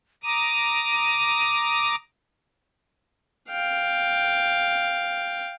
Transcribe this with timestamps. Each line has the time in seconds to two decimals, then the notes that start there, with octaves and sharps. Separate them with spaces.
0.24 A#5 D6 D#6 D#7
3.50 F5 G5